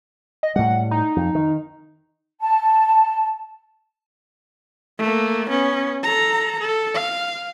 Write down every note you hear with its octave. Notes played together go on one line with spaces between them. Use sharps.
D#5
A2 G3 F#5
D#4
F2
D#3
A5
A3 A#3
B3 C#4
A4 A#5
A4
F5